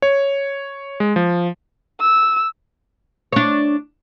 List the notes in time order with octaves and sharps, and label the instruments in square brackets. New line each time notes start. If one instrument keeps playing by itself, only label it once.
[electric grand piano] C#5
G#3
F3
[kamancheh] E6
[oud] D4 C#5